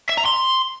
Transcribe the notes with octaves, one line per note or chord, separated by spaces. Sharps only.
E5
A#5
C6